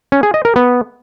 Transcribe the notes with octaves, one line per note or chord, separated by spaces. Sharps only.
C#4
G#4
D#5
A#4
B3